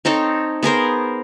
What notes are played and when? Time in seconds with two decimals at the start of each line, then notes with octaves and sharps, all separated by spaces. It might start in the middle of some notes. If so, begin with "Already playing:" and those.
0.05 C4 D#4 A4 C#5
0.63 B3 G#4 A#4 C5